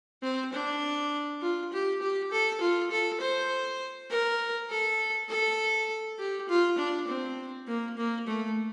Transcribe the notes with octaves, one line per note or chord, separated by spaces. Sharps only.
C4
D4
F4
G4
G4
A4
F4
A4
C5
A#4
A4
A4
G4
F4
D4
C4
A#3
A#3
A3